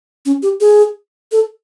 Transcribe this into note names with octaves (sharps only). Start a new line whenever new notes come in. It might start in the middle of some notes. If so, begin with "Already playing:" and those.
C#4
G4
G#4
A4